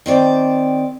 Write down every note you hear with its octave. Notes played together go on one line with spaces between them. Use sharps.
D#3 C4 D5